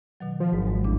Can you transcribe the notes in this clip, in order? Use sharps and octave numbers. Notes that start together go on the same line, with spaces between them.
B2 D#3 F#3
F3
G#1 G#2
G#3
A1 E2 D4